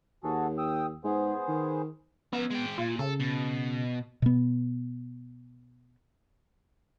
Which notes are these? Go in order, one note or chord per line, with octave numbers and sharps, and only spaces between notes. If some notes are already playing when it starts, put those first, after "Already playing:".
D#2 F#4 G#4 A4
G5 D#6 E6
G#2 B3 G#4 C5
D#3
B3 C#4 E5
G#3 G5
A#2 F4
C#3 A4
B2
B2 B3